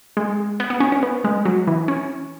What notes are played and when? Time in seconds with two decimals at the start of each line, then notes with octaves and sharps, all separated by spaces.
0.17 G#3
0.60 B3
0.70 B3
0.80 C#4
0.92 C#4
1.03 B3
1.24 G#3
1.45 F#3
1.67 E3
1.88 C#4